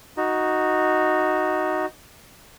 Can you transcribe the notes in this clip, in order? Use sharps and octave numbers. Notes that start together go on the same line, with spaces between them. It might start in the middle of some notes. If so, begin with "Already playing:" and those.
D#4 F#4